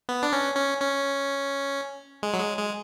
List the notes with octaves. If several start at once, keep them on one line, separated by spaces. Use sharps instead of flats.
B3
D4
C#4
C#4
C#4
G#3
F#3
G#3
G#3